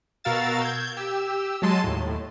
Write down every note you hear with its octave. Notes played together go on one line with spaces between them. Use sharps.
B2 F#4 A#4 F5 E6 A6
G6 G#6
G4 E6
F#3 G#3 A5 C6 D#7
D#2 A2